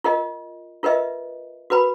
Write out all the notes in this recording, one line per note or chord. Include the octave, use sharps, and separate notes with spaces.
F4 A#4 D#5
F4 A#4 B4 D#5 E5
F#4 A#4 B4 B5